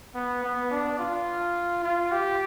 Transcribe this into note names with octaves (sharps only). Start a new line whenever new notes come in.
B3
B3
D4
F4
F4
G4